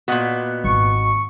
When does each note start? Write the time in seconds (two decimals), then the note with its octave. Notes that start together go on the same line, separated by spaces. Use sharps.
0.08 A#2 B3 F#4 D#5 F#5
0.64 G#1 C#6